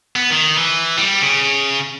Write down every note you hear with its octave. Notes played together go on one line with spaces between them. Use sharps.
B3
D#3
E3
G3
C#3